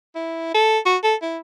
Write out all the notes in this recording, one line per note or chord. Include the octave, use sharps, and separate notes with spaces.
E4
A4
F#4
A4
E4